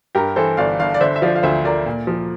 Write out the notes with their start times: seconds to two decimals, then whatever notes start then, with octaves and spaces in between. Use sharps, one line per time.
0.15 G2 G4 A#4
0.36 E3 A4 C5
0.57 G1 D5 F5
0.79 G1 D5 F5
0.94 D5
1.01 D3 C5 E5
1.16 E5
1.22 F3 D5 F5
1.35 F5
1.43 D2 C5 E5
1.65 D2 A#4 D5
1.86 A#2
2.07 F3